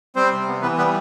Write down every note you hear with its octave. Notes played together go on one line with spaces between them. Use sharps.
G3 C4 C5
C3
B3
E3 B3 B4
G3 B3 B4